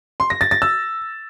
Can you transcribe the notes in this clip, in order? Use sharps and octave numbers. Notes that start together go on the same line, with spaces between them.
C6
A#6
A6
A6
E6